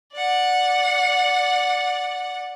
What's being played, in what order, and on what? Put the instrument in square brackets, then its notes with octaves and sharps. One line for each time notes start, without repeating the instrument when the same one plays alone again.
[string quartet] D5 F#5